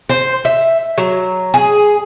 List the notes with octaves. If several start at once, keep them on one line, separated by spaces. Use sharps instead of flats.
C5
E5
F#3
G#4